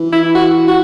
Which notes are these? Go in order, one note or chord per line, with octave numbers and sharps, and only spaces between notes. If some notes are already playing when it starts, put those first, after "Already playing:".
Already playing: E3
E4
F#4
F#4